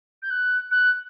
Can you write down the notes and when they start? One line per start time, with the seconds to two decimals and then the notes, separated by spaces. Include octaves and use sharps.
0.23 G6
0.30 F#6
0.71 F#6